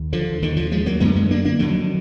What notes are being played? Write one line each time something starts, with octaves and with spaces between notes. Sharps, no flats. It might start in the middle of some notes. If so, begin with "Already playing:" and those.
Already playing: D#2
D3 F3
D#2 D3 D#3
D3 F3
F3 G#3
F#3 A#3
F#2 D3 G#3 B3
G#3 B3
A#3 D4
A#3 D4
F2 D3 D#3 F#3